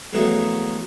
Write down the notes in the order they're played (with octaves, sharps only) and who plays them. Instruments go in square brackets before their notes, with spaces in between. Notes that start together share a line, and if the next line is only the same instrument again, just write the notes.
[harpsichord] A#1 E2 D#3 F#3 A3 A#3